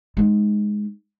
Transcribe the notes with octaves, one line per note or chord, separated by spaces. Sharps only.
G#3 D#4